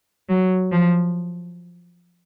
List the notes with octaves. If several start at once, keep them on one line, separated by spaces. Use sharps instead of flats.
F#3
F3